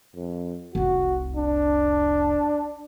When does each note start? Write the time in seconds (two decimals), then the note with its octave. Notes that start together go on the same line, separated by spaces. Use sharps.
0.15 F2
0.75 F1 C2 F#4
1.36 D4